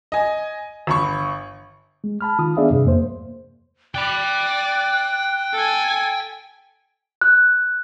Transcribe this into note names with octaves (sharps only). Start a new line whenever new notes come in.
D#5 G#5
G1 B5 C#6
G#3
A5 B5 F6
D#3 F4 D#6
B3 D4 G#4 D5 E5 F5
G2 C3
F2 A#3 C5
D5 G5 B5 F#6
A4 G#5
F#6